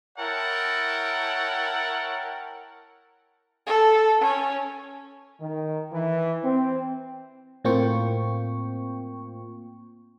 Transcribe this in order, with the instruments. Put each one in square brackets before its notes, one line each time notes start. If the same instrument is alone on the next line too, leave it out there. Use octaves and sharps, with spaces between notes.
[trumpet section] E4 A#4 C#5 F#5 G5 A5
[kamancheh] A4
C#4
[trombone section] D#3
E3
C4
[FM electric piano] A2 A#3 C4 F4 G5 C#6